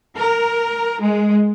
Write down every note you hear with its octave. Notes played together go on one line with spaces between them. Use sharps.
A#4
G#3